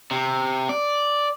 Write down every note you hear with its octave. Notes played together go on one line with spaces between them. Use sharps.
C3
D5